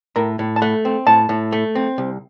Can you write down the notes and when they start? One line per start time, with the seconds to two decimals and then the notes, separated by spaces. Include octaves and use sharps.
0.16 A2 A#4
0.39 A2
0.56 A5
0.62 A3 F#5
0.85 C4
1.07 A2 A5
1.29 A2
1.52 A3
1.75 C4
1.98 C2